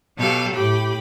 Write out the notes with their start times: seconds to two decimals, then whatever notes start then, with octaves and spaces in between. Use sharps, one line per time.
0.17 B2 F#3 G4 A4 F5
0.53 A2 G4 B5